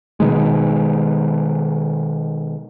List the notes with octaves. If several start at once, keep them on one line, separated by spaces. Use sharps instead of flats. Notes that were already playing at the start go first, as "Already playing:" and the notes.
B2 D#3 G#3